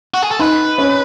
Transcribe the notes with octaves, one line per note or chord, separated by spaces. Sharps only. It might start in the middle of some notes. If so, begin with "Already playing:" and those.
F#4
G#4
A4
D#4 B4
C#4